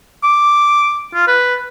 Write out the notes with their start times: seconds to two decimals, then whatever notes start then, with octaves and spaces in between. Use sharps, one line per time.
0.23 D6
1.14 F4
1.27 B4